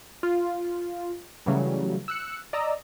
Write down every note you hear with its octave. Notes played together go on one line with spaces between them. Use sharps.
F4
C#3 E3 F#3 G3 A3
E6 F#6 C#7
D5 D#5 A#5 E6